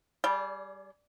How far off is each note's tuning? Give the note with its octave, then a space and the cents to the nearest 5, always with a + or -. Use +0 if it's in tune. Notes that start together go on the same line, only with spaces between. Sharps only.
G3 +0 G#4 +20 D5 -30